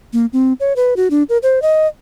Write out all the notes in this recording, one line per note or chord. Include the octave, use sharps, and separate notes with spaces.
A#3
C4
C#5
B4
F#4
D4
A#4
C5
D#5